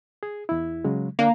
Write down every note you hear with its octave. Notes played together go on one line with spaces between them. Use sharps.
G#4
E2 E4
C#3 F#3 G#3
D3 A#3 D4